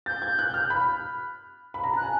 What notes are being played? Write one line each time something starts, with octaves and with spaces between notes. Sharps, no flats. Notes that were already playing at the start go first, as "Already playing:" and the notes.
G6 A6
G#6
F#6
F6
B5
B5
A#5
A5 F#6
G#5